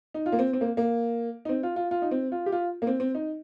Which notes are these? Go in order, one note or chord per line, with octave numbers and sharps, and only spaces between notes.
D#4
F4
A#3
C4
C4
A#3
A#3
D#4
C4
F4
F4
F4
D#4
C4
F4
G4
F4
A#3
C4
C4
D#4